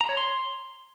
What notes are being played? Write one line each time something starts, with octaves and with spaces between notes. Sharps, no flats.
A#5
C#5
C6